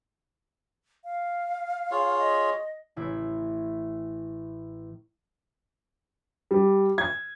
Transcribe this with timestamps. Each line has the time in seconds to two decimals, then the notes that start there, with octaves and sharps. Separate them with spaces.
1.05 F5
1.91 F4 G#4 C#5
2.19 D#5
2.96 A1 E4
6.51 G3
6.98 G#6